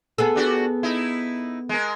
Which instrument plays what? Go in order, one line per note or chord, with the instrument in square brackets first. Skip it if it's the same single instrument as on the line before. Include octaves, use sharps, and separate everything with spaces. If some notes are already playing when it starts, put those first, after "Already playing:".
[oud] B3 G#4 A4
[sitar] D4 F#4 G4
D#4 E4
G#3 A#4